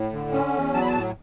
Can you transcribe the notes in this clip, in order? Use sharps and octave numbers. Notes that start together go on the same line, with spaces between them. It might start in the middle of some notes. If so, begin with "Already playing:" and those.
Already playing: A2
D3
C#4
E2
F#3 A5
B5
A5
A2